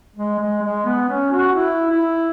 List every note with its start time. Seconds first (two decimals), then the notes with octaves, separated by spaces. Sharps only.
0.16 G#3
0.39 G#3
0.62 G#3
0.86 B3
1.09 C#4
1.32 F#4
1.55 E4
1.90 E4